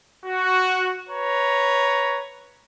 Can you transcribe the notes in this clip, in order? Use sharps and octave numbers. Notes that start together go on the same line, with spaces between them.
F#4
B4 C#5 A#5